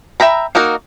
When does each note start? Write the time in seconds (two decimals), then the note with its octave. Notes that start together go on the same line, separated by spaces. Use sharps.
0.20 E5 G5 A#5 B5
0.55 A#3 D#4 F#4 A#4